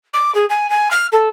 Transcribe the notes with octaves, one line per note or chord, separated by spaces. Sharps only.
D6
G#4
G#5
G#5
F6
A4